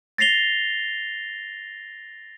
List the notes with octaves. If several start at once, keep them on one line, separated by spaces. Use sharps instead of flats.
A6 A#6 C7 F7 G7